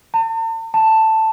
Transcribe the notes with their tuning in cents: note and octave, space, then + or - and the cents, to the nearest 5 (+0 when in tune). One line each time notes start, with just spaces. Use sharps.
A5 +45
A5 +5